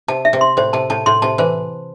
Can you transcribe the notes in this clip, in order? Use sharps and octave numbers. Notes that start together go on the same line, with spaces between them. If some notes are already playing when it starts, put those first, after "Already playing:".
C3 A5
E5
C3
C6
A2 C5
C3 A5
A2 A5
A2 C6
C3 A5
E3 C5